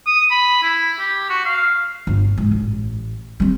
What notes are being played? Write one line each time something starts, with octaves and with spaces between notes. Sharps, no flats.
D#6
B5
E4
G4
F#4
F5
G1
G#2
A1
G3 C4